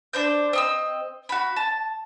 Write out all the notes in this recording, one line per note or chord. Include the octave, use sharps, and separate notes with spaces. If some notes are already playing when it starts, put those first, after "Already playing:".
D4 C5 G6
C4 D#5 E6
F#4 B5
A5